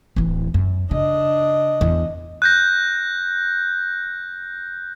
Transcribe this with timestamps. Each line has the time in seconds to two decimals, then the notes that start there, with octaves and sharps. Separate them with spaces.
0.16 D1 E3
0.54 F#2
0.91 C#3 D4 D#5
1.81 E2
2.42 F#6 G6 A#6